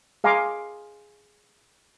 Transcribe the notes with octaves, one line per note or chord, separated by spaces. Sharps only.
G#4 F5 G#5 A#5 C6 D6